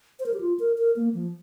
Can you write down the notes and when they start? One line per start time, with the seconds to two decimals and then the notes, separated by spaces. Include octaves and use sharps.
0.20 C5
0.26 A#4
0.34 G4
0.41 F4
0.59 A#4
0.78 A#4
0.96 A#3
1.14 F3